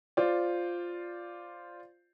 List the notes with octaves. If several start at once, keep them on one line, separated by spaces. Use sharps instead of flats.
F4 C5 D5